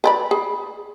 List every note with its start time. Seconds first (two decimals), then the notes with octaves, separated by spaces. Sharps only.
0.04 B4 D5 B5
0.31 G#4